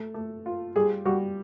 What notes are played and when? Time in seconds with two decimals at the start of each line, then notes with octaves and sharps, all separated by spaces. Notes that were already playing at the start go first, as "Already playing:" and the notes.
Already playing: A3
0.14 A3
0.46 F4
0.76 G3 G#4
1.05 G3 F#4